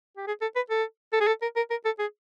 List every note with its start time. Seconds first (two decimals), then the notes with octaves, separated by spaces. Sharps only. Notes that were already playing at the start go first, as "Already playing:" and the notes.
0.17 G4
0.27 G#4
0.41 A4
0.56 B4
0.70 A4
1.13 A4
1.21 G#4
1.27 A4
1.42 A#4
1.56 A#4
1.70 A#4
1.85 A4
1.99 G#4